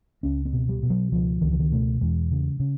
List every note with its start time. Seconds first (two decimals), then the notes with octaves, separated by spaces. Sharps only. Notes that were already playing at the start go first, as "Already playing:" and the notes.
0.23 C#2 C#4
0.45 C4
0.53 B2
0.69 G3
0.83 B2
0.90 F#3
1.12 C#2 F3
1.41 C#2 D#3
1.51 E3
1.59 D#3
1.72 B2 A3
2.01 E2 G#3
2.31 C#3
2.60 C#3